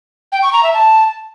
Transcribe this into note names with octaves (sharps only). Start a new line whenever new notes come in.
G5
C#6
A#5
E5
A5